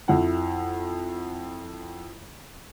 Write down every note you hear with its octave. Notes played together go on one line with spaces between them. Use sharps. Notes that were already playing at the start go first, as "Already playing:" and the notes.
F2 E4 F#5